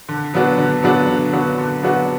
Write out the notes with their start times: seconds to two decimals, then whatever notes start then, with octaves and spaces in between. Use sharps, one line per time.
0.09 D3
0.34 F#3 B3 D4 F#4
0.58 D3
0.83 F#3 B3 D4 F#4
1.08 D3
1.33 F#3 B3 D4 F#4
1.58 D3
1.83 F#3 B3 D4 F#4